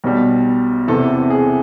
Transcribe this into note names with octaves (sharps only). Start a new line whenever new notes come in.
B1 B2 G3
E2 C3 E3 A4
G#4